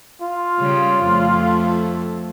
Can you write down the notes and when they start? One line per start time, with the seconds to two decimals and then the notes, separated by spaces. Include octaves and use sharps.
0.22 F4
0.59 C#3 G3
1.04 F2 A3